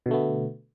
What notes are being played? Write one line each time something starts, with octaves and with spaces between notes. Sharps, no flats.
B2 D3 A3 B3